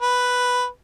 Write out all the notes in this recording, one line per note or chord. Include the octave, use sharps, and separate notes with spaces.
B4